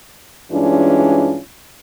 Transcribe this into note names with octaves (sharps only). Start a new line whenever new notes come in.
G2 E3 G#3 C#4 D4 F4